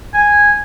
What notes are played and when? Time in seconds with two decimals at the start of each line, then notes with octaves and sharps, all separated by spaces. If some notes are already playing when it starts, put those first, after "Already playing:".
0.14 G#5